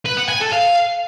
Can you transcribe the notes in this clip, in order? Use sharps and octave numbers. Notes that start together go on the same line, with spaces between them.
B4
F#5
G#5
A4
F5